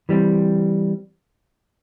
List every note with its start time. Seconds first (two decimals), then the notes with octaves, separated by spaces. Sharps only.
0.09 E3 G3 C4